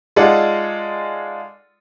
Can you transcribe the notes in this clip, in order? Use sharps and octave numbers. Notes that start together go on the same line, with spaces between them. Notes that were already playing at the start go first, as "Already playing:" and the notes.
G#3 D#4 F4 A4 D5 F#5